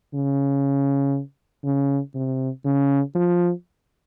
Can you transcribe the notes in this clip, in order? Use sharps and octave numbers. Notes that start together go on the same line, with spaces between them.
C#3
C#3
C3
C#3
F3